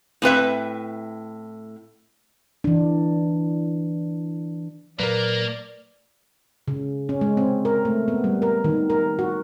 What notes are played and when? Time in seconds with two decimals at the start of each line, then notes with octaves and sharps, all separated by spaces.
0.22 A2 C4 B4 E5
2.64 E3 D4
5.00 A#2 F#3 A#3 A#4 B4 D5
6.68 C#3
7.09 C#4
7.21 G#3
7.37 C4
7.65 A#4
7.85 A3
8.08 B3
8.24 G3
8.42 A#4
8.64 D#3
8.90 A#4
9.19 F#4